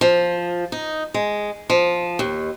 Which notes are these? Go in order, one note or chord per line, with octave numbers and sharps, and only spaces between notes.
F3
D#4
G#3
F3
D#2